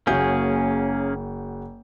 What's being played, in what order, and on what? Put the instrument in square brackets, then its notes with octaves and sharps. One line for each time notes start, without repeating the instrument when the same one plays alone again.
[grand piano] F#1 F#4 G6 [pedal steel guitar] A#3 C#4 G#4